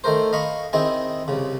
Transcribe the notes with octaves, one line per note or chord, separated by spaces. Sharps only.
D#3 A3 A#4 C5
D#5 F5 B5 C#6
D#3 C4 E4 G#4 D#5
C2 C#3